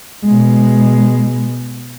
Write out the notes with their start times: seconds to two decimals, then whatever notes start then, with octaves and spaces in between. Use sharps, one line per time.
0.25 B2 G#3